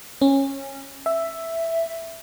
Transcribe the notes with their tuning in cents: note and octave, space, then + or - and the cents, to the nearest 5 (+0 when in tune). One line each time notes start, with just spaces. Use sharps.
C#4 -20
E5 +5